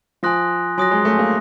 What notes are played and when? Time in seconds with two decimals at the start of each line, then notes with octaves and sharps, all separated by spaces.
0.23 F3 G#5 C6 D#6 F#6 A#6
0.78 F#3 G#5 C6 D#6 F#6 A#6
0.91 G#3
1.05 A3
1.19 A#3